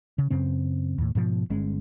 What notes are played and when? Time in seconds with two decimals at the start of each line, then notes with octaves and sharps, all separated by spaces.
0.18 C#3
0.30 F#2 C#3 C4
0.98 D#2 A2
1.15 G#2 B2 F3
1.50 G1 G#3 C#4